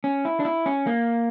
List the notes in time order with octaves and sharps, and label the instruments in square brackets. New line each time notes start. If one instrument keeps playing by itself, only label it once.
[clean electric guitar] C#4
E4
D4
E4
C#4
A#3